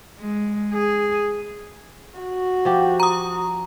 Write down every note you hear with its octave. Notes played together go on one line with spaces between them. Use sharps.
G#3
G#4
F#4
F3 G4
A#5 D#6